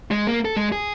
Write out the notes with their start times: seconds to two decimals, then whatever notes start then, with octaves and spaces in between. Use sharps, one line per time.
0.11 G#3
0.27 A#3
0.45 A4
0.57 G#3
0.72 G#4